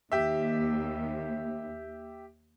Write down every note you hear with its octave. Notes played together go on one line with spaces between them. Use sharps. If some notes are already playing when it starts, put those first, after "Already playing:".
D#2 G4 E5